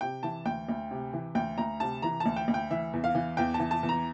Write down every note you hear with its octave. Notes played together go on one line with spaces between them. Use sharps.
C3 G5
E3 A5
D2 G5
D2
C3
E3
D2 G5
D2 A#5
C3 A5
E3 A#5
A5
D2
G5
D2
G5
E3 E5
E2
F5
E3
E2 G5
A5
E3
A5
E2
A#5